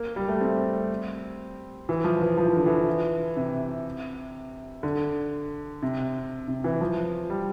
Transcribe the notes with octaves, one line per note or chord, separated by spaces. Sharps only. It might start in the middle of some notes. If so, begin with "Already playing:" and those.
Already playing: A#3
G3
A3
C4
E3
F3
E3
F3
E3
D3
E3
C3
D3
C3
C3
E3
F3
G3